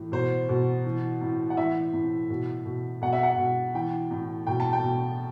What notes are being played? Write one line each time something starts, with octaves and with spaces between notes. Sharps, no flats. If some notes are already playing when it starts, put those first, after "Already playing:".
Already playing: A2 E3
B2 C5
B2
E3
A2
F#5
E3 E5
A2
B2
B2
B2 F#5
E5
F#5
B2
E3 G5
A2
B2 G5
A5
G5
B2